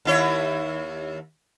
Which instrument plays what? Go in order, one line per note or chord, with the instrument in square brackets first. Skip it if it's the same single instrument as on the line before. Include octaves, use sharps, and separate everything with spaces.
[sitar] D#2 E4 C#5